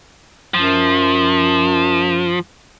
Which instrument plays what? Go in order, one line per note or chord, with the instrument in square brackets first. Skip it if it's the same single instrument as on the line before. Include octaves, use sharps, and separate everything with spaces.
[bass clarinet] F#2 [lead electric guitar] F3